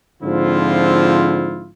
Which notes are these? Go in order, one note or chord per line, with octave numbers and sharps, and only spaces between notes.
G#2 D3 F3 C4 E4 F4